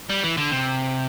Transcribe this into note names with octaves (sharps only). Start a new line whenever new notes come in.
G3
E3
D3
C3